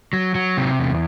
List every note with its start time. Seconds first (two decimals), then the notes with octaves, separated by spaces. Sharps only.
0.13 F#3
0.35 F#3
0.57 C3
0.80 E2